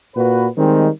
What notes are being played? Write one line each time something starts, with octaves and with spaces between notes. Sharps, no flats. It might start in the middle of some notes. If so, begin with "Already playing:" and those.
A#2 F#4 B4
D#3 G3 G#3 C4